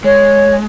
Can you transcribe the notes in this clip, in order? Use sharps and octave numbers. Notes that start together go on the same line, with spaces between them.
G#3 C#5